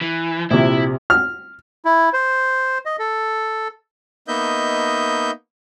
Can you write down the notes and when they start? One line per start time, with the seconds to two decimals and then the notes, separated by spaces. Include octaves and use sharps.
0.01 E3
0.51 A#1 C3 E4
1.10 F6
1.85 E4
2.13 C5
2.86 D#5
2.99 A4
4.28 A#3 B3 D#4 D#5 E5 G6